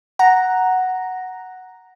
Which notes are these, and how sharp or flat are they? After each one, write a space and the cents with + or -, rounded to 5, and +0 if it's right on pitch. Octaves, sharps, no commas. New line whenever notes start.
F#5 +0 A#5 +0